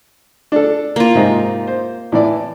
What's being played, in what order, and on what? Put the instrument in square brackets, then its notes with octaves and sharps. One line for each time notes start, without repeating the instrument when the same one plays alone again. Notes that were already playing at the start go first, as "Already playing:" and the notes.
[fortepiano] D4 A4
[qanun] A#3 F4
[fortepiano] G#2 C3 D#4
C5
A2 E3 D5